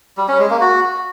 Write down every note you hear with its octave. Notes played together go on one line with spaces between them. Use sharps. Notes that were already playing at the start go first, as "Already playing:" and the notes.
G3
C#4
G#3
A#3
F#4